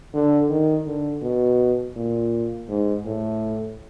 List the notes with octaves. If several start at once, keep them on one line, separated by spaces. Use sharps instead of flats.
D3
D#3
D3
B2
A#2
G#2
A2